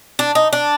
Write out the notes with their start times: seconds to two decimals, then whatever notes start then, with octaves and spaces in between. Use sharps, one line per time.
0.19 D4
0.35 D#4
0.53 D4